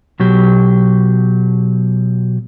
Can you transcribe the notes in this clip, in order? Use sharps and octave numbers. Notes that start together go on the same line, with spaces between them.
B2 F#3 G4